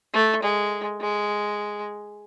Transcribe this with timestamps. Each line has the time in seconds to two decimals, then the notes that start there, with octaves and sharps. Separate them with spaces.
0.14 A3
0.43 G#3
1.01 G#3